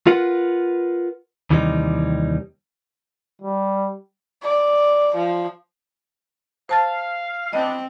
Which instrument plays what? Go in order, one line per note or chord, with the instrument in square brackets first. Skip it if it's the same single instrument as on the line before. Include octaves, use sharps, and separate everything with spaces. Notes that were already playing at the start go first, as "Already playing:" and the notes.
[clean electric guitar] F4 A#4 B4 F#5
D#2 C3 E3 G3 C#4 D#4
[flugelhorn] G3
[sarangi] D5
F3
[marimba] C5 A5 A6 [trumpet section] F5
[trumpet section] B3 D4 [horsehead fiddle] C4 [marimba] D#5